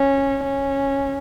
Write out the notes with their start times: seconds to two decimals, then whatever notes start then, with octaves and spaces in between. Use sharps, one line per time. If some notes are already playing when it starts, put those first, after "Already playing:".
Already playing: C#4
0.44 C#4